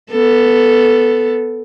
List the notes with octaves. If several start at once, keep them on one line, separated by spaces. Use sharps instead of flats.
B3 A4